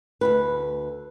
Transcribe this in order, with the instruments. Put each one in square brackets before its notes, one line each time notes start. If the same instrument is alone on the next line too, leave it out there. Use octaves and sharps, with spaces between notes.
[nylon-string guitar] D2 G#2 B4